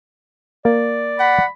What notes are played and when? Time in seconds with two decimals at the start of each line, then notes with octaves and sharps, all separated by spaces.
0.65 A#3 D5
1.20 F#5 B5